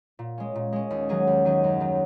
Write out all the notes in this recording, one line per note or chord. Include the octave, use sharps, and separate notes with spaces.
A#2
G#3 C#4
A#2
G#3 C#4
D#2
D#3 F#3 C#4 G#4
D#2
D#3 F#3 C#4 G#4
F#2
D#3 F#3